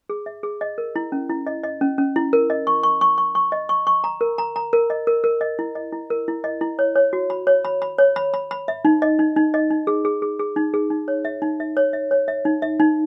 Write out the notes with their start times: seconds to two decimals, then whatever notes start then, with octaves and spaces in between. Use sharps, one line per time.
0.10 G#4
0.26 E5
0.43 G#4
0.61 D#5
0.78 A#4
0.96 E4
1.12 C#4
1.29 E4
1.47 D#5
1.64 D#5
1.81 C#4
1.98 C#4
2.16 E4
2.33 A#4
2.50 D#5
2.67 C#6
2.83 C#6
3.01 C#6
3.18 C#6
3.35 C#6
3.52 D#5
3.69 C#6
3.87 C#6
4.04 A#5
4.21 A#4
4.38 A#5
4.56 A#5
4.73 A#4
4.90 D#5
5.07 A#4
5.24 A#4
5.41 D#5
5.59 E4
5.75 D#5
5.92 E4
6.10 A#4
6.28 E4
6.44 D#5
6.61 E4
6.79 C#5
6.95 C#5
7.13 F#4
7.30 B5
7.47 C#5
7.65 B5
7.82 B5
7.98 C#5
8.16 B5
8.34 B5
8.51 B5
8.68 E5
8.85 D#4
9.02 D#5
9.19 D#4
9.36 D#4
9.54 D#5
9.71 D#4
9.87 G#4
10.05 G#4
10.22 G#4
10.39 G#4
10.56 D#4
10.74 G#4
10.90 D#4
11.08 C#5
11.25 E5
11.42 D#4
11.60 E5
11.77 C#5
11.93 E5
12.11 C#5
12.28 E5
12.45 D#4
12.62 E5
12.80 D#4